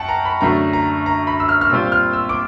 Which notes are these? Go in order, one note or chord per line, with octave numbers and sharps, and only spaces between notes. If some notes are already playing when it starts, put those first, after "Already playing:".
Already playing: F#2 F#5 G5 A5
A#5
B5
F#2 D3 F#3 A3 A#5
A#5
A#5
B5
E6
F6
F6
A#2 G3 C4 F4 E6
F6
E6
D6